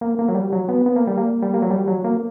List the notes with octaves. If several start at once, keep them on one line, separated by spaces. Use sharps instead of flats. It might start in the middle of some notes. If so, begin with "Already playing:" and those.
A#3
A#3
F#3
G3
F#3
B3
B3
A#3
G3
A#3
G3
A#3
F#3
G3
F#3
A#3